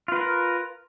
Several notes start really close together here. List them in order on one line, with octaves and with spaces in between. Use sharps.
F4 B4 A#4